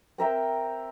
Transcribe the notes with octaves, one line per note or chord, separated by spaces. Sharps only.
C4 A#4 E5 G5